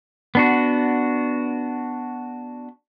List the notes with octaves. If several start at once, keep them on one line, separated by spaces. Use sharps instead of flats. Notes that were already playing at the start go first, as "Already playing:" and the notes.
B3 D4 F#4